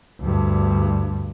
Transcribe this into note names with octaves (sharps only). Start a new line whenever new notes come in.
D2 G2